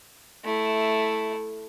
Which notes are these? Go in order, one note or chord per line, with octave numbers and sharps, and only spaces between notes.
A3 E4